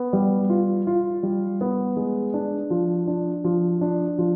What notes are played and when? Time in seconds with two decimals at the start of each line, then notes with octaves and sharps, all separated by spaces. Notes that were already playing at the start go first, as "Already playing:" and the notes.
Already playing: B3
0.13 G3
0.49 F4
0.87 F4
1.23 G3
1.61 B3
1.96 G#3
2.34 D4
2.70 F3
3.07 D4
3.44 F3
3.81 D4
4.18 F3